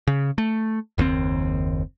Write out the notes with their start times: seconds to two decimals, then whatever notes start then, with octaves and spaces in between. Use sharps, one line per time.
0.07 C#3
0.38 A3
0.98 F#1 D#2 C#3 C4